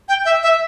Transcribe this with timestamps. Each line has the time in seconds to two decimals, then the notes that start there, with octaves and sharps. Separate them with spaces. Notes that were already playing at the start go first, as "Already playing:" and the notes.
0.09 G5
0.25 E5
0.43 E5